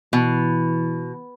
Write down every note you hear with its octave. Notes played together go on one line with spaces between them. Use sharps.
B2 E3